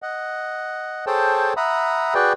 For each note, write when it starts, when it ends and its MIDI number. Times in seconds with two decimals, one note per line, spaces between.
0.02 1.05 75
0.02 1.05 78
1.07 1.54 68
1.07 1.54 69
1.07 1.54 72
1.07 1.54 73
1.07 1.54 79
1.07 1.54 81
1.57 2.14 76
1.57 2.14 78
1.57 2.14 82
1.57 2.14 83
1.57 2.14 87
2.14 2.33 66
2.14 2.33 68
2.14 2.33 71
2.14 2.33 74
2.14 2.33 79